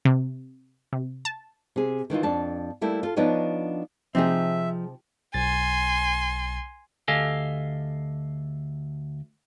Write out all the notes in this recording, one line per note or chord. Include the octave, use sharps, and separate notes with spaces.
C3
C3
A5
C3 G#4
D#3 E3 D#4 F4
F2 D4 A5
G3 A3 A#3 E4
F4 A4
F3 B3 D4 D#4 C#5 D#5
C3 F3 C4 D#4 G#4 E5
B1 G#5 C6 A6
D2 G4 A4 D#5 F5 G#5